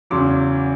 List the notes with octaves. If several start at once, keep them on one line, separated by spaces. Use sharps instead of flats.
E2 C#3 F#3 C6 D6